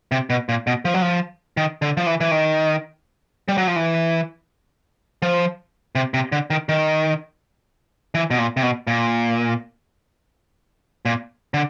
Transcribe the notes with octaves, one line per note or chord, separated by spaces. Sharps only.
C3
B2
A#2
B2
F3
F#3
F3
D#3
D3
F3
E3
E3
D#3
G3
F#3
F3
E3
F3
C3
C3
D3
D#3
D#3
E3
B2
A#2
C3
B2
A#2
A#2
D3